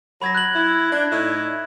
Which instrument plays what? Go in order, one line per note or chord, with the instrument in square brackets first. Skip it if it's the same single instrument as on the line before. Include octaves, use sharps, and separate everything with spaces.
[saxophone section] F#3 [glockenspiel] B5 G#6 A#6
[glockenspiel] F#6 G#6 F#7
[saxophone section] E4
D4
A2 D#4 E4